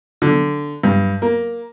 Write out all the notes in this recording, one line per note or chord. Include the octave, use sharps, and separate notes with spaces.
D3
G2
A#3